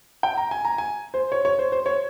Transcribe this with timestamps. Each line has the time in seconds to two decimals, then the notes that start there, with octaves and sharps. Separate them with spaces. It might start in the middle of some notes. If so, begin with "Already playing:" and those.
0.23 G5
0.37 A#5
0.51 G#5
0.65 A#5
0.78 G#5
1.14 C5
1.32 C#5
1.45 C#5
1.59 C5
1.72 C5
1.86 C#5